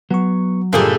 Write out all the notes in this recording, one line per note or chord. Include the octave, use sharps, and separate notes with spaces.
F#3 B3 C#6
G2 A#2 D3 G3 A3 A#3 G4 G#4